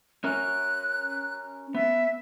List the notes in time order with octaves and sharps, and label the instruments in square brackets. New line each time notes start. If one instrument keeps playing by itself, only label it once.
[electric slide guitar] C#4 A#4 [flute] F#6
[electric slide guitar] B3 [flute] E5